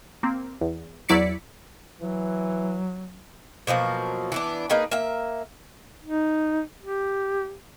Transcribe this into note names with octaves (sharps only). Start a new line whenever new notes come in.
A#3 C4
E2
E2 F#3 E4 D5 B6 C#7
E3 F#3
B2 F3 F#3 A#3
E3 B3 D4
A#3 D#4 G#4 B4
A#3 E5
D#4
G4